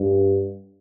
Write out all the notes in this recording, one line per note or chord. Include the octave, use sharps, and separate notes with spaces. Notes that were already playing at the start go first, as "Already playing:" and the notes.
Already playing: G2